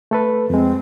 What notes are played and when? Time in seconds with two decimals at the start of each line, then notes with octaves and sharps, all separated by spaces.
0.11 A3 A4 B4
0.50 F2 G#3 C4